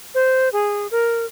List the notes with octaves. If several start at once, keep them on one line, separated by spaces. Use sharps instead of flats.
C5
G#4
A#4